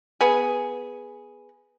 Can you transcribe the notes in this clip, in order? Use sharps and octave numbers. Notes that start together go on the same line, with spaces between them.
B3 G#4